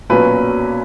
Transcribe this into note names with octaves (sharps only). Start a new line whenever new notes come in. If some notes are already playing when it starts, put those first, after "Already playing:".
B1 A#2 F#3 C#4 B4